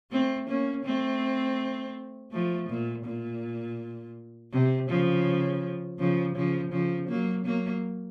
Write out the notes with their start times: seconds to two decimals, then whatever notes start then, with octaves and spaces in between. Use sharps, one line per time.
0.11 A3 C4
0.48 A#3 C#4
0.85 A3 C4
2.32 F3 A3
2.69 A#2
3.05 A#2
4.53 C3
4.89 C#3 F3
5.99 C#3 F3
6.36 C#3 F3
6.72 C#3 F3
7.09 F#3 A#3
7.45 F#3 A#3